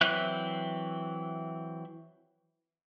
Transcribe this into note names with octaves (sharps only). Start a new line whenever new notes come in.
E3 F#3 C4 E5 F#6